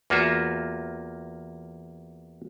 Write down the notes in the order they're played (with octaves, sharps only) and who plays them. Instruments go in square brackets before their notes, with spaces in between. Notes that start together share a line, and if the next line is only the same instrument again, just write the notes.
[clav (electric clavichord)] E2 A#3 F4 F#4 E5